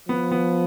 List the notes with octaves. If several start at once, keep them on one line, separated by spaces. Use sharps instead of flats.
F3 B3
B3